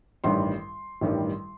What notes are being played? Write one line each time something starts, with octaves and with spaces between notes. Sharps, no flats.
A1 G2 D#3 G3 C6
A1 G2 D#3 G3